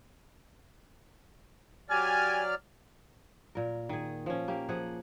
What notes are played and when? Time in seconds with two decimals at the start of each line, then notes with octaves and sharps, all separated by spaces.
1.89 F#3 G4 D5 G#5 F6
3.55 A#2 A#4
3.89 D#3 G#4
4.26 F3 C#4
4.48 A#3 G4
4.69 F3 G#4 F#5